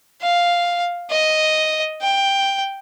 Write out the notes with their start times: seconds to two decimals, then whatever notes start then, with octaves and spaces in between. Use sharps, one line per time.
0.22 F5
1.10 D#5
2.02 G5